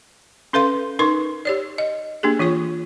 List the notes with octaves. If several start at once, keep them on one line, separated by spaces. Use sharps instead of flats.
C#4 A4 B4 F5 C6
D#4 A#4 B4 C6 C#6
G4 C#5 D5
D#5
A#3 D4 G4 G#4
E3 F4 C#5 C#6